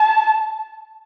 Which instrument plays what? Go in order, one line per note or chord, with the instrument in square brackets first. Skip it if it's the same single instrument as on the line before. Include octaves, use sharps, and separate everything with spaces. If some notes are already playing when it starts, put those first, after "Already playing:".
Already playing: [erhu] A5